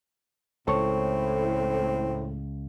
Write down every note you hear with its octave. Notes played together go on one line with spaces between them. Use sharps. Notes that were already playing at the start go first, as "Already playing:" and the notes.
C#2 A2 C4 A4 C#5 C#6